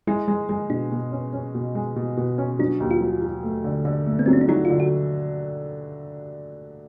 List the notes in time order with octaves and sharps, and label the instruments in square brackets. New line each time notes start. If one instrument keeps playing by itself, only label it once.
[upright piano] G#3 [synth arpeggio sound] E4
[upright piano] G#3
G#3
[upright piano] B2 [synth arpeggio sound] D4
[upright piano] B2
C#4
C#4
B2
G#3
B2
B2
C#4
[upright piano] F#3 [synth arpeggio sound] D4
[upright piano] D#2
[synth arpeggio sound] F4
[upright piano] F#3
F#3
A3
D3
D3
A3
[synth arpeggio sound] B3
[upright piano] F#3 [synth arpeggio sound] C4
[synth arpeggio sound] C#4
D4
[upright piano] F#3 [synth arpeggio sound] D#4
[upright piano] D3 [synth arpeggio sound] F4
[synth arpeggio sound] F#4